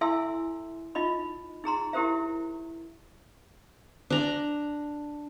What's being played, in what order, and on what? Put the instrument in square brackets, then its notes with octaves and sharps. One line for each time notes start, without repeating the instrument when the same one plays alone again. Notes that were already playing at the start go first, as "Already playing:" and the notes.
[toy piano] E4 A4 E5 G#5 C6 E6
D#4 F4 D#5 B5
D#4 G#4 A#5 C6
E4 G4 A#4 C5 E5
[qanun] D4 A#5